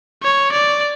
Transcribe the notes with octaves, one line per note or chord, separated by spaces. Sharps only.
C#5
D5